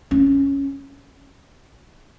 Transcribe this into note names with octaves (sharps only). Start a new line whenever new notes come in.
C#4